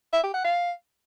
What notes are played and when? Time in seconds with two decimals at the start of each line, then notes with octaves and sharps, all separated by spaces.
0.13 E5
0.23 G4
0.34 F#5
0.44 F5